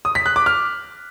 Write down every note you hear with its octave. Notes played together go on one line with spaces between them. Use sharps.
D#6
B6
F#6
D6
F6